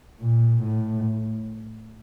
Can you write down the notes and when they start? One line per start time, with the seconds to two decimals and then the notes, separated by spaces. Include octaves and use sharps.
0.21 A#2
0.63 A2